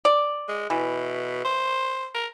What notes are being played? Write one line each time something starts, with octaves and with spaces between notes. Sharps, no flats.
D5
G#3
B2 E3
C5
A#4